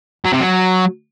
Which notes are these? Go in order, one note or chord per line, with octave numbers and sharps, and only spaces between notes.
F#3
C3
F#3